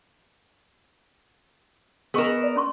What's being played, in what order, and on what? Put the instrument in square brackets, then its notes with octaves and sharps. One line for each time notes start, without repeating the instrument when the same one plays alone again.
[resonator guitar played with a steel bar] B3 A#4 [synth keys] G#4 D#5 E7 [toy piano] C#6 E6
[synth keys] D5
[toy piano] C#4 C6 C#6